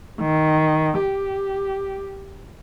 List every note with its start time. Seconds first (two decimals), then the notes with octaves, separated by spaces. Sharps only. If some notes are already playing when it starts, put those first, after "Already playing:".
0.21 D#3
1.00 G4